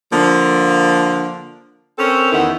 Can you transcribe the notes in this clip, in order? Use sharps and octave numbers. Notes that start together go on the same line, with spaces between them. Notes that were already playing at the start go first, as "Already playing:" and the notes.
D3 F3 A#3
C4 C#4 A4 A#4
E2 D#3 E4 F#5